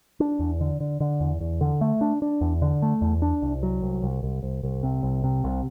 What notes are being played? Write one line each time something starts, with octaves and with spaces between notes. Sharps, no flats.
D4
E2
D3
D3
D3
E2
E2
D3
A3
D4
D4
E2
D3
A3
E2
D4
C2
F#3
C2
C2
C2
C2
C2
C3
C2
C3
C2